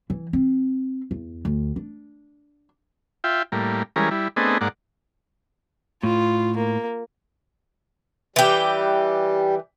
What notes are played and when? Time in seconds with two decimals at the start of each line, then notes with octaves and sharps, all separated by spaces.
0.10 E3
0.33 C4
1.11 E2
1.45 D2
1.76 D4
3.24 F4 E5 G5
3.52 A2 G3 A#3
3.96 E3 G3 G#3 C#4 A#4
4.11 G3 E4
4.36 A3 B3 C4 D4 G#4 D#5
4.61 G#2 A#3 D5 F#5
6.03 A2 F4
6.57 A#3
8.36 E3 G3 G4